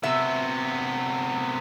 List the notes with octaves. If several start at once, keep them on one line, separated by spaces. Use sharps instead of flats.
C3 B3 E5